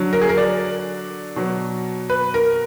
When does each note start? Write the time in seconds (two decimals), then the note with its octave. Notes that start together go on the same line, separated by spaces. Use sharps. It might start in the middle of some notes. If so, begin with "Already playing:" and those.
Already playing: D3 F#3
0.13 A#4
0.21 G#4
0.29 A#4
0.38 D5
1.36 B2 F#3
2.10 B4
2.34 A#4